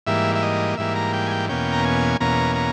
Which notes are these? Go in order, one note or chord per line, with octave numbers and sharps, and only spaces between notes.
G#2 E3 G3 A#3 E5
E5
D#5
G#2 E3 G3 A#3 E5
A#5
G5
G#5
G5
E2 B2 A#3 C#4 G5
A#5
G#5
E2 B2 A#3 C#4 A#5
A#5